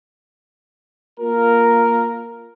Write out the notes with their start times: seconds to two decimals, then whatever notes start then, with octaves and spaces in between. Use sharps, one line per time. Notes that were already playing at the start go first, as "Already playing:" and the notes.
1.20 A#3 F4 A#4